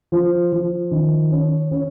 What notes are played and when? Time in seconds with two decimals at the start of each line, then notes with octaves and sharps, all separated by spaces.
0.12 F3
0.52 F3
0.91 D#3
1.31 C#4
1.71 C#4